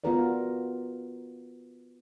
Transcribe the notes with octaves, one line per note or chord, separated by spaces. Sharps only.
B3 F4 F#4 A#4 B4 D5